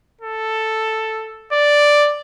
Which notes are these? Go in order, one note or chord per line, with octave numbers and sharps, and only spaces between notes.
A4
D5